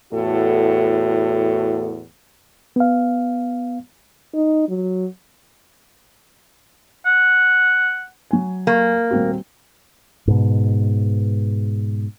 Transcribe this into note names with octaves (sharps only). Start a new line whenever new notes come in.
E2 A2 F#4 A4
B3 F5
D#4
F#3
F#5
F#3 G#5
A#3
D#1 C4 F#4
G#2 B2